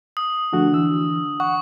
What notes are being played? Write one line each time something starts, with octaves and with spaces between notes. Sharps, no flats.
D#6
D3 F3 A3 F#4
E3 E6
F#5 C#6